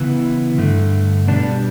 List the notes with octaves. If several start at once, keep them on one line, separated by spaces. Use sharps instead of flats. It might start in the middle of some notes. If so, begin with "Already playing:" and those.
Already playing: C#3 E3 B3 E4
G2 D3 A3
B2 G3 B3 D4